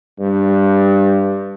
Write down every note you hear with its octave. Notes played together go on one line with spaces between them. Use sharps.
G2